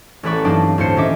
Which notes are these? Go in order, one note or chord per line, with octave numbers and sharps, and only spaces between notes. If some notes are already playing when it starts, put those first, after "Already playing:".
A1 A3 E4 B4 D5 C#6
G2 F#3 A#3 C4 D4 D#4
D2 A2 C5 C#7
D#3 C#4 D#5 E5 D6